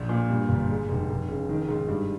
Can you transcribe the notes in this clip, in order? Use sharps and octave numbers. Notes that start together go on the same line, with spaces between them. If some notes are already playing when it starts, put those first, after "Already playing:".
Already playing: A#1
A#2
G2
G1
G#3
F1
F1
C#3
D#3
G#2
G2